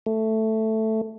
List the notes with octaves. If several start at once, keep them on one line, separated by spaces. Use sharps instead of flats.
A3